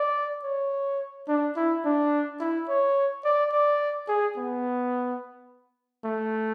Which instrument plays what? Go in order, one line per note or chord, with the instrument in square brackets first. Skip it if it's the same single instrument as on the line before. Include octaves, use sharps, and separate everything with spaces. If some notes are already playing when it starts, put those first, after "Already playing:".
Already playing: [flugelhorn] D5
C#5
D4
E4
D4
E4
C#5
D5
D5
G#4
B3
A3